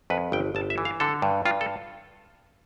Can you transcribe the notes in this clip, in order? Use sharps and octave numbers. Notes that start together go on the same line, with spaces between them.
F2 B4
G1 G5
G1 A5
E5
E3
F5
D3 A4
G2
G2 F4
A4